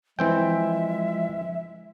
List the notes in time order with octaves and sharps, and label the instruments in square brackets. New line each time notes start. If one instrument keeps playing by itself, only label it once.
[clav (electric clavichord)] E3 C4 G5 [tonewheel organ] F3 [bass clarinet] G#3 [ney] E5